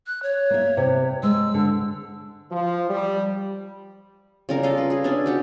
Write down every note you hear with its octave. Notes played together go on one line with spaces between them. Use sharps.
F#6
C#5
A#3 E5
C3
G#3 E6
D3
F3
G3
C#3 G3 A#4
F4 A4 D#5 F5
B4
G#4 B4
C#4 D4 E5
F#4 G4 F#5